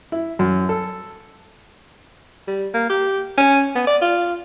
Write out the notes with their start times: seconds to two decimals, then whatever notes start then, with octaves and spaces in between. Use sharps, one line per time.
0.12 E4
0.39 F#2
0.69 A4
2.47 G3
2.74 A#3
2.89 G4
3.37 C#4
3.75 B3
3.87 D5
4.01 F4